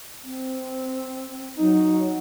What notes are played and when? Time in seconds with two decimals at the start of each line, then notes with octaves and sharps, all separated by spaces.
0.23 C4
1.58 F#3 D#4